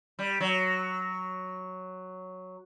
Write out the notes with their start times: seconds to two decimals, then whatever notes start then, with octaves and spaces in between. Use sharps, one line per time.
0.19 G3
0.40 F#3